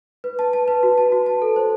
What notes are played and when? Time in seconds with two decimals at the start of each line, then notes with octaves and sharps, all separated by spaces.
0.24 B4
0.39 A5
0.53 A5
0.68 B4
0.83 F#4
0.98 A5
1.12 F#4
1.26 A5
1.42 A4
1.56 C5